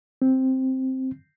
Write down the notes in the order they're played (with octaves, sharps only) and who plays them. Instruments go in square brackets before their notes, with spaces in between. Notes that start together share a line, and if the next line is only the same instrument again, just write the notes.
[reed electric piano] C4